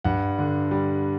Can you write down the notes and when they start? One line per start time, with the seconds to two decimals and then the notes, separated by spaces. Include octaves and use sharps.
0.04 G2 F#5
0.38 D3
0.71 G3